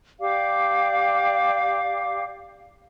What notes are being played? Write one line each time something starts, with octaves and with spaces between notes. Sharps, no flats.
G4 D5 F5 D6